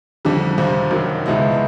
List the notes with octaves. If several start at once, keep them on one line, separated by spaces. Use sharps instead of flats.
F2 D3 G3
F2 C3 F3
F#2 D#3 F#3
C#2 B2 G#3 B3 E4